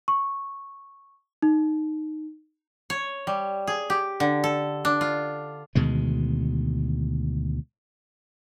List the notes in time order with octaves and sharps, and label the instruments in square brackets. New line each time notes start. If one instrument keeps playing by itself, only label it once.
[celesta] C#6
D#4
[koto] C#5
G3
G#4
G4
D3
A4
D4
F4
[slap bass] D2 B2 D#3 G#3